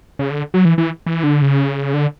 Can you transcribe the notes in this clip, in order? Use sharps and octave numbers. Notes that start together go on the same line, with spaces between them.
C#3
D3
F#3
E3
E3
E3
D3
C#3
D3